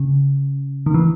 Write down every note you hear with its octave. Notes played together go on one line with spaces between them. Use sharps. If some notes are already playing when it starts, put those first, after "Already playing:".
Already playing: C#3
D#3
E3